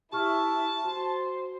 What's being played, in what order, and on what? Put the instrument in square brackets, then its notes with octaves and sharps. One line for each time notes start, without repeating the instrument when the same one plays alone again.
[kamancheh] E4 E5 [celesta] G4 C#6 F6 [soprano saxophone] A5
[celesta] F#4 [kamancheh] C5